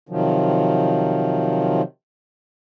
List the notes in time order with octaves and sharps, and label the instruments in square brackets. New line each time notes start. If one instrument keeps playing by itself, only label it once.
[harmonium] C3 D#3 F3 F#3